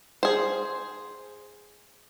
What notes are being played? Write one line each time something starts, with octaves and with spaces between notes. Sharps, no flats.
G#4 C5